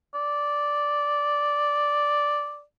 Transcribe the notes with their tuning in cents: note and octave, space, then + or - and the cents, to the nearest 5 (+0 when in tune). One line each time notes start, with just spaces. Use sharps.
D5 -5